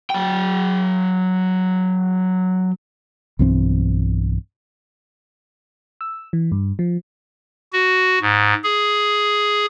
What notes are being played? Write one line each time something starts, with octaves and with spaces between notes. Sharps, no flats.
F#3 G5
B1 G2 E3 C4
E6
E3
G2
F3
F#4
G#2
G#4